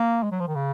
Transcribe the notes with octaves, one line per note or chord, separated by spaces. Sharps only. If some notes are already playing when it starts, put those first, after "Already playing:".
Already playing: A#3
G#3
F#3
F3
D#3
C#3